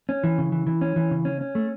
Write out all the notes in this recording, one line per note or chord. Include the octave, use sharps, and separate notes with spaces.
C#4
E3
C#3
E3
E3
C#4
E3
C#3
C#4
C#4
A3